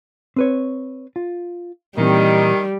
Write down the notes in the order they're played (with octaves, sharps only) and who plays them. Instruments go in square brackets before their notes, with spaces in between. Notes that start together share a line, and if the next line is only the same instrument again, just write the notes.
[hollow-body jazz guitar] C4 B4 C#5
F4
[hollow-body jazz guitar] A#2 E3 C4 [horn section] D#3 [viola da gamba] G3